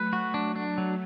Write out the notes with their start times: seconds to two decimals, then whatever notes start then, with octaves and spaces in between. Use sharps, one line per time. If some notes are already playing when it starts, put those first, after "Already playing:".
Already playing: F#3 A3 B4
0.13 F#4
0.34 D4
0.56 D4
0.78 F#3